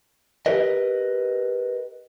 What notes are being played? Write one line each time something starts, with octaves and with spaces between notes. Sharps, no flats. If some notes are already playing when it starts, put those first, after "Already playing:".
G4 A#4 B4 D#5